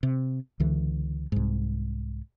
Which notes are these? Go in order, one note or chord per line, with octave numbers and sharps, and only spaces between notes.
C3
C#2 D3 E3
C2 G#2